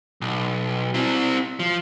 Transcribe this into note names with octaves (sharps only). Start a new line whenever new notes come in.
B1
C4 E4
F3